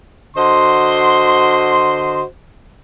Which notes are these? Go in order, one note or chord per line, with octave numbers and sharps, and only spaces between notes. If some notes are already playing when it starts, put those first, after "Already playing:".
D3 F#4 C5 D#5 C6